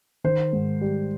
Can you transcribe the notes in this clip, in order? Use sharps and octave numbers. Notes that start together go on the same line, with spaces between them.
D#3 C5
G#2
G3